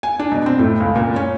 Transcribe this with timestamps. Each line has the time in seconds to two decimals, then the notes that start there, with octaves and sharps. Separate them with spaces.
0.03 G#5
0.19 D4
0.32 B2
0.46 C4
0.59 A2
0.80 C#2
0.96 A#2
1.16 C#4